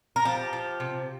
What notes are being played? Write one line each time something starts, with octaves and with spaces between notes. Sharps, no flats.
A#4
F3 G4
F3
C3